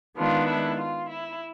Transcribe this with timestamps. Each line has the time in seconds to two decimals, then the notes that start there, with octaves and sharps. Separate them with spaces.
0.16 D#3 G#3 B3 D4 F4
0.47 E4
0.78 F4
1.09 E4